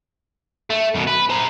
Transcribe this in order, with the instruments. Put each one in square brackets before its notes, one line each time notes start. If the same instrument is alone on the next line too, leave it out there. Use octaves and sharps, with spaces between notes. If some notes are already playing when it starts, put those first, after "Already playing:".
[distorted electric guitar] A3
F#2 B2
B4
C5 A#5